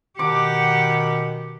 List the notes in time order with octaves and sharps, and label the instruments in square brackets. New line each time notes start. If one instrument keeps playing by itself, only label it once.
[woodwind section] B2 D#3 [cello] G4 F#5 [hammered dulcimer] D6